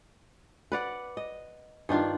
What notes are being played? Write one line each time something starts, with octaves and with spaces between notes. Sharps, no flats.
B4 D5 F#5
D#5
G2 D#3 D4 F4